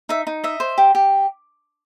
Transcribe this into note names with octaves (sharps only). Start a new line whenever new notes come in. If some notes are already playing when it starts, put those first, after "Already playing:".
D#4 E5
D#4
D#5 E5
C5
G4
G4